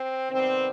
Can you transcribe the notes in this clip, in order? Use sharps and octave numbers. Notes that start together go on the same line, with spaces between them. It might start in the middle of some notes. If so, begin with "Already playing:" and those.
Already playing: C4
C3 D#3 G3 B3 C4